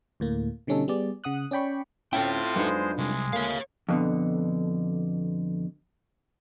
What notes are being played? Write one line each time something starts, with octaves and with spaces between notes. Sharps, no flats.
D2 A2 A#3
B2 D3 G3 C#4 D#4 A4
G3 B3 G#4 D5
C#3 F#5 D#6 F#6
C#4 D5 G5 B5 C#6
D2 G2 C4 C#4 E4 F4 A4 G5
F2 F#3 G#3 B3 D4 D#4 C5
C3 G3 G#3
D2 C#3 A#3 C#5 F5
F2 B2 D3